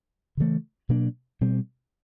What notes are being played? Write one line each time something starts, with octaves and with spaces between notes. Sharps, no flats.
C#3 E3 A3
B2 F#3 A#3 D4
B2 G3 C4